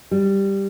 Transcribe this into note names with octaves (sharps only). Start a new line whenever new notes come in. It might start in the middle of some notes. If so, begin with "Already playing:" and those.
G3